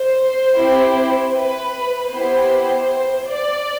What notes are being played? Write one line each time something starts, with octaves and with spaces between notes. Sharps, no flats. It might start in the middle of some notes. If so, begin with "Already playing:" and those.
Already playing: C5
C4 E4 G4
B4
B3 E4 G4 C5
D5